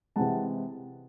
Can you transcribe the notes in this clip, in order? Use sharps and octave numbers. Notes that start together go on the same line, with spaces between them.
C3 E3 G#3 F#5 A5